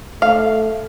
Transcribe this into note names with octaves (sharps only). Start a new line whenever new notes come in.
A3 F5